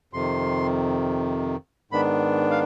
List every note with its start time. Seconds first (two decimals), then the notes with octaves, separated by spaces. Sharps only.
0.13 F2 C3 D#3 C6
1.91 G#2 D#3 B3 D4 B5
2.51 F5